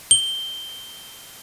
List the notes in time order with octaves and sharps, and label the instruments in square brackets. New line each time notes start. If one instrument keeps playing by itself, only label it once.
[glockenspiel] G7